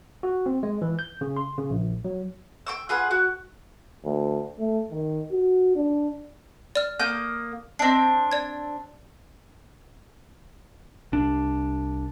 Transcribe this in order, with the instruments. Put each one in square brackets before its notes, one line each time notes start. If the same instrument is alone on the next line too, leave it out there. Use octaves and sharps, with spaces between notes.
[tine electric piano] F#4
C4
G#3
E3
G6
C#3
C6
C#3
A#1
F#3
[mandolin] G5 C#6 E6
F4 G#4 B4 F#5
F#4
[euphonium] D2
A3
D#3
F#4
D4
[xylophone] D5 F6
[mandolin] A#3 D#6 G6
[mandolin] C4 D4 [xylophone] D#5 C7
[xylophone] D5 G#6
[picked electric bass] C2 D4